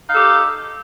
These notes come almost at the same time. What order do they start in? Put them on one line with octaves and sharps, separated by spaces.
D#4 F5 A4 G4